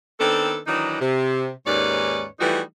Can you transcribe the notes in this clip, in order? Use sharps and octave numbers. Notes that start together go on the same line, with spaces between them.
D#3 B3 C4 D4 A4
D#3 E3 F#3 D4 D#4
C3
D#2 G#2 C#4 B4 C#5 D5
E3 F3 G3 A3 D#4 F#4